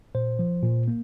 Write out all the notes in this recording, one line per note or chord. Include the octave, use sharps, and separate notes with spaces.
A#2 C5
F3
A#2
A#3